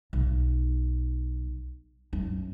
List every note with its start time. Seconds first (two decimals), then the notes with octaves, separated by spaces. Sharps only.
0.13 B1
2.13 F#2